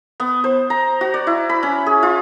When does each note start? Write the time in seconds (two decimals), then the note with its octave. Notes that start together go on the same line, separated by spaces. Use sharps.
0.20 B3
0.44 C5
0.70 A#5
1.01 F#4
1.14 D5
1.27 E4
1.49 B5
1.63 C#4
1.86 G#4
2.03 F4